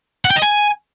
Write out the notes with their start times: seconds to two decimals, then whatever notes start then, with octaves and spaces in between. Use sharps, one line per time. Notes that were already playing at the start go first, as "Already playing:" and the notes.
0.25 F#5
0.31 G5
0.36 D#5
0.42 G#5